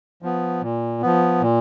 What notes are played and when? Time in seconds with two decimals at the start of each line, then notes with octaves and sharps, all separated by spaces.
0.22 F3 B3
0.62 A#2
1.02 F3 B3
1.42 A#2